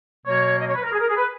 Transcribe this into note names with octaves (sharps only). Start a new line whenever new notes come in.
B2 F#3 A#3 C#5
D#5
C#5
B4
A#4
G#4
A#4
G#4
B4